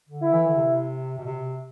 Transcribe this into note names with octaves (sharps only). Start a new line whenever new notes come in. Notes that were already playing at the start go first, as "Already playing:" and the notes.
D3
E4
E3
D3
C3
B2
C3